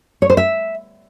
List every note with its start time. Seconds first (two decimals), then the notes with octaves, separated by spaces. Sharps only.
0.22 C#5
0.30 C5
0.37 E5